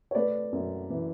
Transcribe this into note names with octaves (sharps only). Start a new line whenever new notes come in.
C#5
A3 B4 D5
F#2
E3